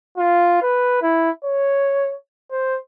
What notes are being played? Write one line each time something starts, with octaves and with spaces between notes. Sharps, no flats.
F4
B4
E4
C#5
C5